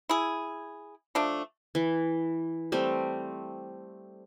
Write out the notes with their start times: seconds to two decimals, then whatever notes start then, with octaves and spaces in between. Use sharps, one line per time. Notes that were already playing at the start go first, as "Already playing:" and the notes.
0.09 E4 G#4
1.15 F3 A3 D4
1.75 E3
2.72 G3 A3 C4